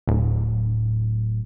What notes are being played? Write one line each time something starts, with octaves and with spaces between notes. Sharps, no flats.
D1